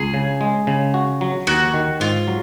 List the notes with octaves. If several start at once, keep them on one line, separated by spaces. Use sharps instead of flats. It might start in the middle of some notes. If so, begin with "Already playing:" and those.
Already playing: C#2 G#4
C#3
G#3
C#3
F#4
F#3
D#2 F#4
D#3
G#2 F4
F#3